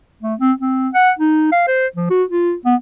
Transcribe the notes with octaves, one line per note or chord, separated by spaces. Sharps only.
A3
C4
C4
F#5
D#4
F5
C5
F3
F#4
F4
B3